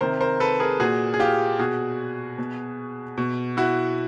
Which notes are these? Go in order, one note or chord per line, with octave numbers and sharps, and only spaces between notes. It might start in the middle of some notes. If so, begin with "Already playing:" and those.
C3 D#3 A#4 C5
A#4 C5
A4 B4
G#4 A#4
A#2 F#4 G#4
G#4
F4 G4
B2 F#4 G#4
B2
B2
E4 F#4